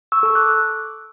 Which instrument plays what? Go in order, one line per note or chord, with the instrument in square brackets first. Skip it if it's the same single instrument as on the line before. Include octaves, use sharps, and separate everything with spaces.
[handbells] C#6 E6
A4 E6
D6 F#6